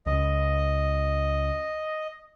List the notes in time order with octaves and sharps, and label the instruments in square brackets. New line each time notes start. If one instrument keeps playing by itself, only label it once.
[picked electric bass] C#2 [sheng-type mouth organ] D#5